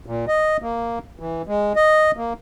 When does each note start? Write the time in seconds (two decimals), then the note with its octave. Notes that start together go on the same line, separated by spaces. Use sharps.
0.06 A#2
0.28 D#5
0.62 A#3
1.20 E3
1.47 G#3
1.76 D#5
2.17 A#3